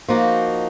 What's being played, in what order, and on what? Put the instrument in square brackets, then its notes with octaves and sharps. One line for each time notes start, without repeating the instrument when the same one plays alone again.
[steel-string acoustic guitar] F3 A#3 D#4 F#4